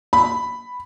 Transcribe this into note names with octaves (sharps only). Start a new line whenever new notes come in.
B5